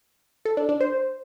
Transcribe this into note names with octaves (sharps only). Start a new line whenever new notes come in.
A4
D4
D4
C5